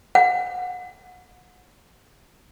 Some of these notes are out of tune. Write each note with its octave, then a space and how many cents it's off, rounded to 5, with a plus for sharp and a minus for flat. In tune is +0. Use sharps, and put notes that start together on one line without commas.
F#5 -30